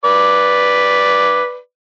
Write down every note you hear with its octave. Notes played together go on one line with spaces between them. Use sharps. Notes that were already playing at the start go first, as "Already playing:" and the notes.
B4 D5